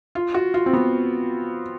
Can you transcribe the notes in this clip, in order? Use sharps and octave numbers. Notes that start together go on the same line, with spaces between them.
F4
F#4
F4
C4
B3